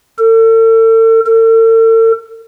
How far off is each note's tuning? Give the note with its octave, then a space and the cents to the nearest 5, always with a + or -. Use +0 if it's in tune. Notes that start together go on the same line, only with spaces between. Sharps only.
A4 +40
A4 +45